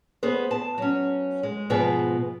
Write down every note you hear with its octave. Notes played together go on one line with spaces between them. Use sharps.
B3 G#4 B4 C5
A5
F#3 C#4
G#3
G#2 B2 F3 B3 G#4 B4